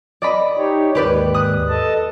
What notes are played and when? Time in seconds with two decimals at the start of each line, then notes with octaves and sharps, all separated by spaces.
0.22 D5 D#5 B5
0.57 D#4 G4 C#5
0.95 D#2 G#2 G4 B4 D5
1.34 D#6 F#6
1.69 A4 D#5 A5